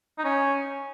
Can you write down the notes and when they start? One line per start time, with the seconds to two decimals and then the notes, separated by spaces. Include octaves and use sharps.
0.19 D#4
0.24 C#4